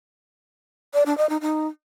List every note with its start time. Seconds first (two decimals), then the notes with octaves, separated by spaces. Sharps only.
0.94 D5
1.06 D4
1.18 D#5
1.29 D#4
1.41 D#4